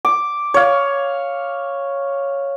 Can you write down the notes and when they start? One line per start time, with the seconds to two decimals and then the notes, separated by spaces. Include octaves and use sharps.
0.05 D6
0.54 C#5 F5